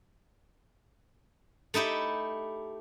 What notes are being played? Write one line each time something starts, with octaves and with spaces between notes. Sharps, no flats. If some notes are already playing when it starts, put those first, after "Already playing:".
A3 D#4 E4 G4